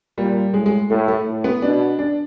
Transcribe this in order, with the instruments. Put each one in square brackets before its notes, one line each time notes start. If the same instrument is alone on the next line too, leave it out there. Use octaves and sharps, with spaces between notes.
[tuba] A#2 [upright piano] G3
[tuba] A2 [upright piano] G#3
[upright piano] G#3
[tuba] A2 [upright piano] A3
[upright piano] A3
[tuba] A2
[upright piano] B3
[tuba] B2 [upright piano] D4
[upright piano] D4